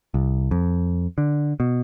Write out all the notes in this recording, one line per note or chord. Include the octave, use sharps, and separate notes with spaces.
C2
F2
D3
B2